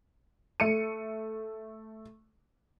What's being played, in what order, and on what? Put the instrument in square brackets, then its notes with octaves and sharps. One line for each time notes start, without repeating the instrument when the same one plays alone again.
[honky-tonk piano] A3 C#7 D#7